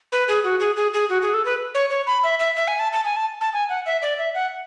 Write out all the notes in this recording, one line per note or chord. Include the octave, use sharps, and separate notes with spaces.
B4
G#4
F#4
G#4
G#4
G#4
F#4
G#4
A4
B4
C#5
C#5
B5
E5
E5
E5
G#5
A5
A5
G#5
A5
A5
G#5
F#5
E5
D5
E5
F#5